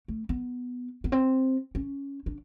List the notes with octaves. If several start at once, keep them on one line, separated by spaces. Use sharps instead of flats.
A3
B3
B3
C4
C#4
D4